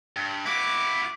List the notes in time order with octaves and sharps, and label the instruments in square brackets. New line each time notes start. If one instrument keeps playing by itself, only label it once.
[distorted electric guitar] G2
[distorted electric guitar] E4 F#4 [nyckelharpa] D6